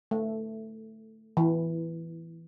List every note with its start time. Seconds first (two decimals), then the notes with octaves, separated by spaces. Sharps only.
0.11 A3
1.37 E3